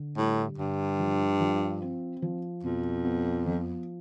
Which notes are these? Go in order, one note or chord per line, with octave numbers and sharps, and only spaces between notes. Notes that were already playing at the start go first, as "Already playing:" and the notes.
Already playing: D3
A2 G3
G2 D3
F3
F3
C4
F3
F2 B2
B3
F3